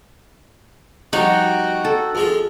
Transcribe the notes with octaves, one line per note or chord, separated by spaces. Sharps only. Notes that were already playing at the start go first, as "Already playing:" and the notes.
F3 G3 D#4 F#4 F#5 G5
A4
F2 G#3 F4